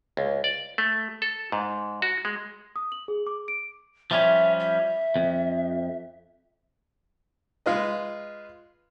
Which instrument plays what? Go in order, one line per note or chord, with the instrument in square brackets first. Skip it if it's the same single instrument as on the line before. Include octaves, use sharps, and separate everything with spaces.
[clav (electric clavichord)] C#2
D5
A3
A4
G#2
F#4
G#3
[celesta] D#6
F#7
G#4
D6
D7
[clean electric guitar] F3 G3 C#4 [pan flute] E5
[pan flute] E5
[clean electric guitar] F2
[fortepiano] G#3 F4 B4 D#5